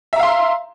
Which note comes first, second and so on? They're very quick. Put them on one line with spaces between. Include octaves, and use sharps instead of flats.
E5 A#5 F5 C6